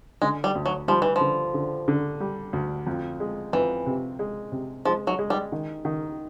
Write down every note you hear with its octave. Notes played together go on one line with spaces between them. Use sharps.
D3 G#3
G3
D2
F#3
F3 G3
E3
D3 F3
D3
D3
G3
D2
F2
G#3
F2 E3
C3
G#3
C3
F3 G#3
F#3
G#3
G3
D#3
D#3